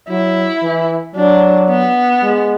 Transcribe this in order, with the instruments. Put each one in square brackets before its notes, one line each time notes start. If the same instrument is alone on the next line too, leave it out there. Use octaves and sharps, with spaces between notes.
[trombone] F#3 [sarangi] E4
[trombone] E3
[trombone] F#3 [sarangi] D4
[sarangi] B3
[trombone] G#3